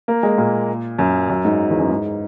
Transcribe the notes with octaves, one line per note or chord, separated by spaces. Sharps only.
A#3
G#3
A#2
F#2
F#2
G#2
E2
F#2
G#2